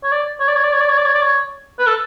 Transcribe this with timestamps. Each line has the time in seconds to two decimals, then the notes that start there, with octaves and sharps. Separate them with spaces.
0.04 C#5
0.12 D5
0.40 C#5
0.48 D5
0.56 C#5
0.64 D5
0.73 C#5
0.81 D5
0.89 C#5
0.98 D5
1.05 C#5
1.14 D5
1.22 C#5
1.79 B4
1.87 A4